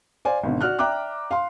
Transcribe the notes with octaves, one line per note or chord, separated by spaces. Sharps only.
C5 D5 F5 G#5
G#1 B2 D3
F#4 D5 F6 F#6
D5 E5 G5 A#5 D6 F#6
F5 C6